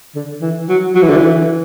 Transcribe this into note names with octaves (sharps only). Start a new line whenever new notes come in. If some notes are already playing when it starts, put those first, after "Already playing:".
D3
E3
F#3
F#3
E3
D3
E3